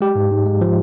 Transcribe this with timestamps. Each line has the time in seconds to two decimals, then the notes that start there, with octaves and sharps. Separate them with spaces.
0.01 G#3 G4
0.16 G#2
0.31 G#2
0.46 G#3
0.61 F3